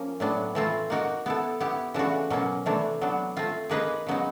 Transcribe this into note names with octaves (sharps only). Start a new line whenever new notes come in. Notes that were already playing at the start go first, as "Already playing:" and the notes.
Already playing: F3 A#3 C#4
A2 F#3 B3 D4
E3 A3 C4 F4
A#3 D#4 F#4 A#4
B3 E4 A4
B3 E4 G4
C#3 E3 A3 D4 F#4
B2 F#3 A#3 C#4
C3 E3 A3 D4
F#3 B3 D4
A3 C4 F4
A#3 D#4 G#4 B4 D#5
C#3 F#3 B3 D#4